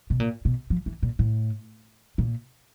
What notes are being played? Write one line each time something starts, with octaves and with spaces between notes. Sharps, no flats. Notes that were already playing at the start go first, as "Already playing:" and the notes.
B2
A#2
B2
F3
E3
A#2
A2
A#2